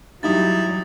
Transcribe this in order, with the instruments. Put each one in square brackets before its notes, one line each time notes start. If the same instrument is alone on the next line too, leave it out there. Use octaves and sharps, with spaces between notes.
[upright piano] G2 D#4 G4 [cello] F#3 G3 [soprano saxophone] E4 [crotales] D#6 A6